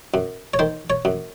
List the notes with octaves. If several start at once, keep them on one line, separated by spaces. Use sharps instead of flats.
F#2
C#5
D#3 C5
C#5
F#2